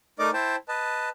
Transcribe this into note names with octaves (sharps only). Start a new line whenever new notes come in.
A3 D#4 A#4 D5 D#5 D6
E4 C5 G5 A5
B4 D#5 A5